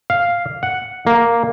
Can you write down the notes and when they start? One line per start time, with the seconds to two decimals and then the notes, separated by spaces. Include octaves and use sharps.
0.10 F5
0.63 F#5
1.07 A#3